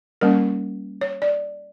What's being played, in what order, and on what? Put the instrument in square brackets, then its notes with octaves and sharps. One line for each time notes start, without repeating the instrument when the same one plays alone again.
[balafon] G3 A#3 C#4 A#4
C#5
D5